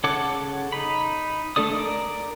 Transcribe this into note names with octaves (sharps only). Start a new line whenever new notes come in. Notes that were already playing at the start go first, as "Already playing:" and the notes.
C#3 A4 C#5 F#5 D6
D#4 B5
A3 D4 A4 D5 D#6
A#4 D5